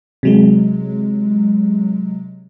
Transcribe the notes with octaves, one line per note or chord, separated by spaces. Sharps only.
C3 F#3 G#3